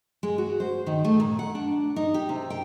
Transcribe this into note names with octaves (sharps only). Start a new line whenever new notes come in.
G#3
F#4
C5
D#3
A3
A#2
F#5
D4
D#4
G4
C3
G5